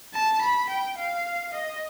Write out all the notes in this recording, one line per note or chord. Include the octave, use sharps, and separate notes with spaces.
A5
B5
G5
F5
D#5